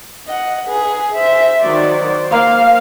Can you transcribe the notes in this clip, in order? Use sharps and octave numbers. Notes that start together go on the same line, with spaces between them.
D#5 F#5
G#4 B4
C5 E5
D#3 F#3 C5 D5
A#3 F5